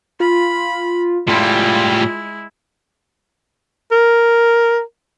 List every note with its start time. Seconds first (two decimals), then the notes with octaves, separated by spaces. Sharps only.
0.20 F4 B5
1.28 A2 G3 G#3 E4 F4
3.91 A#4